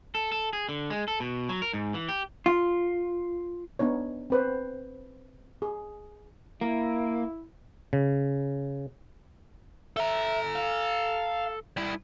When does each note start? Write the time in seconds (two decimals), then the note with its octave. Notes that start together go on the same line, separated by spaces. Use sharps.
0.15 A4
0.32 A4
0.53 G#4
0.69 D3
0.90 G#3
1.08 A4
1.20 B2
1.49 F#3
1.62 A#4
1.73 G#2
1.94 E3
2.09 G4
2.46 F4
3.79 B3 D4 D#4 C#5
4.30 C4 B4 C5
5.62 G#4
6.61 A#3 E4
7.93 C#3
9.97 A4 E5 A#5
10.56 F5
11.77 G3 E4